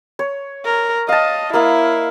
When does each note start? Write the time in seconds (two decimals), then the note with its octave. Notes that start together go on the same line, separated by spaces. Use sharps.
0.19 C#5
0.65 A#4
1.09 D#5 F5 A5
1.53 A#3 E4 D#5 F5